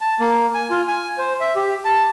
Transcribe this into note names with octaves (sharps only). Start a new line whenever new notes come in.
A5
A#3
G#5
F4
G#5
C5
E5
G4
A5